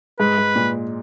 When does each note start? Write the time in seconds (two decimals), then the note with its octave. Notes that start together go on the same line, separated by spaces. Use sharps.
0.19 G#2 B4
0.38 G#2
0.56 A#2